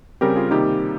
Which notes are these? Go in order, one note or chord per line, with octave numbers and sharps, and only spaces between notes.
C#3 G3 C4 G4 A#4
F4 G#4
C3 D#3 G3 A#3 D#4 G4